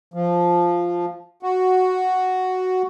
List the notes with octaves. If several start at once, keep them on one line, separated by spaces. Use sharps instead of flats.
F3
F#4